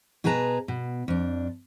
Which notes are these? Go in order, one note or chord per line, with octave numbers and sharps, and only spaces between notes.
B2 G#4 B4 A5 A#5
B2
F2 D4